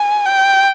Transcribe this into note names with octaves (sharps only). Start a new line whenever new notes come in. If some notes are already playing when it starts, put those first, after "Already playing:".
Already playing: G#5
G5